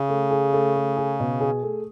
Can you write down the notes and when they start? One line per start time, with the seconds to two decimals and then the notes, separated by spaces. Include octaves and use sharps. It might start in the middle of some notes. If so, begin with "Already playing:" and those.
Already playing: C#3
0.09 A3
0.31 G#4
0.53 A3
0.76 A3
0.97 G#4
1.20 B2
1.41 G#4
1.63 A3